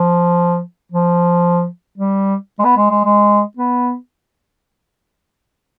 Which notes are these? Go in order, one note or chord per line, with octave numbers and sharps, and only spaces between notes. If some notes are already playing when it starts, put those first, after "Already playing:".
Already playing: F3
F3
G3
G#3
B3
G#3
G#3
G#3
B3